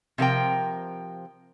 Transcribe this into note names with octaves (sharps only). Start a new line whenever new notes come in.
C3 F3 A#4 G5